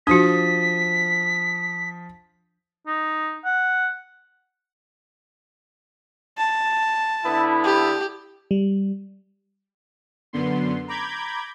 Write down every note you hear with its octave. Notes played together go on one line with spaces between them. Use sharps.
F3 D4 F#4 D#6 B6
D#4
F#5
A5
D3 B3 E4
G4
G3
F#2 D3 B3 C6
A#5 B5 D6 G6 G#6